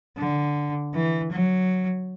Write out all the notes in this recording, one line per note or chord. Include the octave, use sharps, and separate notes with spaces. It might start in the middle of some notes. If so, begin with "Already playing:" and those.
D3
E3
F#3